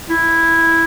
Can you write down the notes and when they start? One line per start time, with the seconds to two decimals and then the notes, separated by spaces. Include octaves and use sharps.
0.10 E4